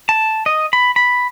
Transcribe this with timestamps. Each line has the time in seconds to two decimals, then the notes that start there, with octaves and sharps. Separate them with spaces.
0.09 A5
0.46 D#5
0.73 B5
0.96 B5